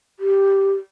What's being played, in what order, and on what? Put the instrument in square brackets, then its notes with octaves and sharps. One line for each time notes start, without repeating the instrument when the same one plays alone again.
[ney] G4